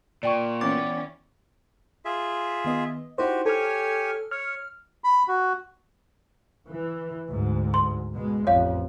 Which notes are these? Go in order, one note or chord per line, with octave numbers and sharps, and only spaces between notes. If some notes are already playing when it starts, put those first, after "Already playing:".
A#2 D5 G5 C#6
E3 B3 C#4 D6 A6
F4 G#4 E5
D#3 B3 D#5
D#4 E4 F#4 G4 C5
G4 A4 C#5 G#5 F6
C#5 F6
B5
F#4
E3
D2 G#2
C6
B2 G#3
A1 F2 C#5 F5